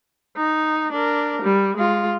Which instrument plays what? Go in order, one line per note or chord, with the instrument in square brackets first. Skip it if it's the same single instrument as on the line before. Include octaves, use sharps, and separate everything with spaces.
[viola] D#4
D4 A#4
G3
G#3 F4